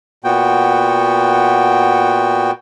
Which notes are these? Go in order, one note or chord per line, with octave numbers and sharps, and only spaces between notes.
A#2 B3 F#4 G5